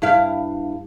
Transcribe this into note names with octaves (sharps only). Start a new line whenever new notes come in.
G2 E4 F5